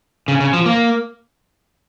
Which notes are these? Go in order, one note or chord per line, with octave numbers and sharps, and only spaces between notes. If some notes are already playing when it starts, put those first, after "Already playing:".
C#3
C#3
F3
A#3